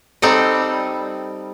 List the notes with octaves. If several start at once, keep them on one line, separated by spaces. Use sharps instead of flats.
G3 C4 D#4 A4 D#5